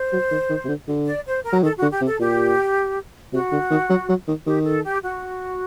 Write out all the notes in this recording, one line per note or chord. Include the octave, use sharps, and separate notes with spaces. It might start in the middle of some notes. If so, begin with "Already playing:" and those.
Already playing: C5
F#3
D#3
D#3
C3
D3
D3
D5
C5
A#4
F#3
D#3 A4
F#4
D3
G4
C3
A4
A#2 G4
C3 F#4
D3
D#3
F#3
F#3
D#3
D#3 G4
A4
G4
F#4